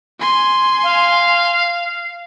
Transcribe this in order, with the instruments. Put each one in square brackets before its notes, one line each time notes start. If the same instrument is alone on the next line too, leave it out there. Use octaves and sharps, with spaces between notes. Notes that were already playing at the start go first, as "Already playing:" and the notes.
[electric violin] G#5 C6
[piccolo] F5